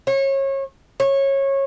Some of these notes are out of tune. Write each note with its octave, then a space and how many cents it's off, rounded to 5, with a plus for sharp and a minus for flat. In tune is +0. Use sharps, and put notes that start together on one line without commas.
C#5 -30
C#5 -20